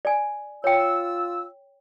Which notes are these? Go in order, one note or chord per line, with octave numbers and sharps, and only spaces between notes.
D5 G#5
F4 C#5 G5 E6